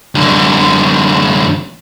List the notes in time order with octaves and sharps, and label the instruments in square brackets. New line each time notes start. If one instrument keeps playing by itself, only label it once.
[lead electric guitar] F#2 D3